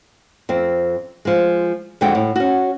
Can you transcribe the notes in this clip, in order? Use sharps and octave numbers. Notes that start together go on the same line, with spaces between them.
F2 C4
F3 G#3
F2 D3 G#3 F#4 F#5 G5
A2
C#4 F#4